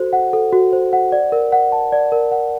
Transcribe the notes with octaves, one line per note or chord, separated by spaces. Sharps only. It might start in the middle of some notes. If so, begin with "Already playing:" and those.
Already playing: F#4 A4 C5
F#5
A4
F#4
C5
F#5
D5
A#4
F#5
A5
D5
A#4
F#5